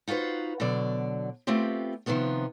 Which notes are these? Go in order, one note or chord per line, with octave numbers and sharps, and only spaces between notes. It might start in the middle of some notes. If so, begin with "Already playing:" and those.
D#4 F4 F#4 B4 C5
B2 D3 F#3 D5
A3 B3 C4 F4 G4
C3 D#3 F3 B3 F4